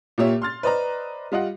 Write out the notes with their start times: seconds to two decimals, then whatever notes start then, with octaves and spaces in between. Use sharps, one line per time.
0.18 A#2 A#3 G4 C#5 E5
0.42 C6 F6 A6
0.63 B4 C5 D5 D#5 A#5
1.32 G3 F4 D#5 F#5